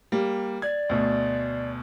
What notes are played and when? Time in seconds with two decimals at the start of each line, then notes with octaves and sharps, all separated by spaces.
0.12 G3 A#3
0.62 D5 G#6
0.89 D2 B2